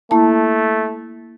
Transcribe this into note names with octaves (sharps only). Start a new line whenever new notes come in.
A3 A#3 E4 A5